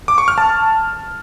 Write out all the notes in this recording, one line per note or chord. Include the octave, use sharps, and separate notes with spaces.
D6
C#6
F6
A5